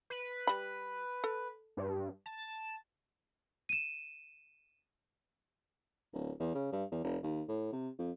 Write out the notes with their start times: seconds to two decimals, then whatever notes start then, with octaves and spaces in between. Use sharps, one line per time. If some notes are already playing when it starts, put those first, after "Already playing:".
0.10 B4
0.47 G3 B5
1.24 A4
1.77 G2
2.26 A5
3.69 D#7 E7
6.13 D1
6.39 E2
6.55 C#3
6.72 G2
6.92 E2
7.04 F1
7.23 D#2
7.48 A2
7.72 C3
7.99 F2